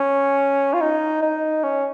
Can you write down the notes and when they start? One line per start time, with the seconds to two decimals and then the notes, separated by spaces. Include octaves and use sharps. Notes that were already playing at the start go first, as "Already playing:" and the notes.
Already playing: C#4
0.74 F4
0.81 D#4
1.22 D#4
1.63 C#4